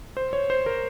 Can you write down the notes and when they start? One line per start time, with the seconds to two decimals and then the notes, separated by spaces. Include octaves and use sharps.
0.17 C5
0.33 C#5
0.50 C5
0.66 A#4